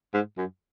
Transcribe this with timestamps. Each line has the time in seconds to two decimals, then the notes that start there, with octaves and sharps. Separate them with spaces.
0.14 G#2
0.37 F#2